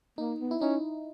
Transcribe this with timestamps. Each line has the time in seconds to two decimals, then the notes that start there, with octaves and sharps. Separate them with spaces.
0.18 A#3 D#4
0.40 B3
0.51 E4
0.61 C#4 D#4